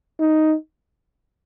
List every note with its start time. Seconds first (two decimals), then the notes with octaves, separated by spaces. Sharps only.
0.20 D#4